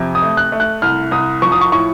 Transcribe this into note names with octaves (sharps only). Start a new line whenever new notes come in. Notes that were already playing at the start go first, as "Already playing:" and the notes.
Already playing: F2 C3
D#6
A3
F#6
A3
F#6
C2 F6
C2 D#6
F3 C#6
D#6
C#6
A2 C#6